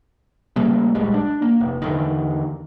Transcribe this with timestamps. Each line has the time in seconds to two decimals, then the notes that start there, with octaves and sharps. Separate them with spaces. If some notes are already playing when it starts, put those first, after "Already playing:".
0.56 C#3 G3 A3 A#3
0.95 D1 A#1 G3 G#3
1.14 D4
1.42 A#3
1.60 F1
1.82 E2 D3 D#3